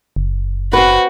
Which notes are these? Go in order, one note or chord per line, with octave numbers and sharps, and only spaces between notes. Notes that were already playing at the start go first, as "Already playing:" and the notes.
F#1
C4 F#4 B4